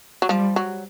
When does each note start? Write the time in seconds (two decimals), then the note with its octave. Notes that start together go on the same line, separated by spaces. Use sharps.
0.22 F#3
0.29 F3 G3
0.56 F#3